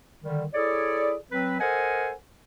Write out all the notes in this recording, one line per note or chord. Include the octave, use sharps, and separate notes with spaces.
D3 D#3 G3
E4 G#4 A4 C#5 D5
F#3 C4 B4
A4 A#4 C5 D#5 F#5 G#5